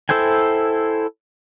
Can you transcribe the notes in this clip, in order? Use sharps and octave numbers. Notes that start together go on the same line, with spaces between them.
E4 A4 C5 G5 G#5